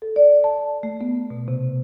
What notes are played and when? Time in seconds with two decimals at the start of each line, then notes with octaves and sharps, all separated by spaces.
0.02 A4
0.16 D5
0.44 A5
0.83 A3
1.01 B3
1.30 B2
1.48 C3